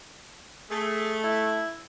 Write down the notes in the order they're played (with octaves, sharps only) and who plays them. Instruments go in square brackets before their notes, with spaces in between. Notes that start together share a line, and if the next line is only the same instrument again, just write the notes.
[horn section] A3 [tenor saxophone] G#4
[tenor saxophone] E4